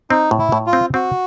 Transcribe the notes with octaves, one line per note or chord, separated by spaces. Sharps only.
C4 D#4
A2
E4
A2
F4
C4
C4 F#4